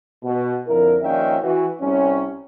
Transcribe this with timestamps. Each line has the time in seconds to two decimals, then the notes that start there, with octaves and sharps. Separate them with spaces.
0.23 B2
0.67 F2 D3 E4 A#4
1.01 A#1 A#2 D#3 C#4 E5 G5
1.41 E3 F#4
1.80 C2 C#4